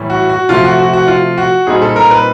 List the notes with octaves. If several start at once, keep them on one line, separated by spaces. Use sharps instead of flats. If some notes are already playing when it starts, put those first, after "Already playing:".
Already playing: A2 E3 G3
F#4
F#4
C3 F3 A3 F4
F#4
F#4
F#4
F4
F#4
A#2 G3 C4 D#4 G#4
A4
A#4
B4